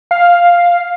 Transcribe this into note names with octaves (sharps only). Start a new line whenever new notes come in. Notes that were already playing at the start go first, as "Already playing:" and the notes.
F5